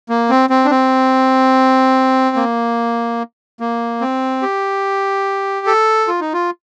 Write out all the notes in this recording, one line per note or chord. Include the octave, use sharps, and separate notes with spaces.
A#3
C4
C4
D4
C4
A#3
A#3
C4
G4
A4
F4
D#4
F4